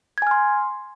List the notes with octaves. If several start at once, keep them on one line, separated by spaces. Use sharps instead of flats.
G#5 C6 F6 G#6